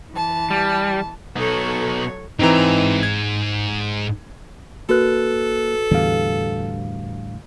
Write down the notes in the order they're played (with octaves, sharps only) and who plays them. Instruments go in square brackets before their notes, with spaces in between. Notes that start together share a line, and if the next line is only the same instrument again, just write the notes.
[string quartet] E3 A5
[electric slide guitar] G3
[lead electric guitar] B2 D#4 [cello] F#3 C#5 [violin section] A4
[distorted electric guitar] G#2 A#5 [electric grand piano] E3 C4 D#4
[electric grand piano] G#6
[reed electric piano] A#3 F#6 [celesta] F#4 B4 [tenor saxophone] A4
[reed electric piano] E2 F5 [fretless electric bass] A2 D3 G3